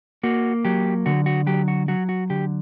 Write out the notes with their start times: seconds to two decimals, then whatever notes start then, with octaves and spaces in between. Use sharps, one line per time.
0.23 A#3 F#4
0.65 F#3 G4
1.06 D3 F#4
1.26 F#4
1.47 F#3 G4
1.68 F#4
1.88 F#3 F#4
2.09 F#4
2.30 D3 G4